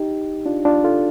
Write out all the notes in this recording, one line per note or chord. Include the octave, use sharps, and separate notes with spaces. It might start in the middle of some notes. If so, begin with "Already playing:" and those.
Already playing: D#4 G4
D4 F4
D4 F4
F4 A4